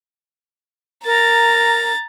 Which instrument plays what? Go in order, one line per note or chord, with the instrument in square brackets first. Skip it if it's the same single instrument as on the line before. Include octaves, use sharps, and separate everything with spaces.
[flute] A#4 [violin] A#5 A6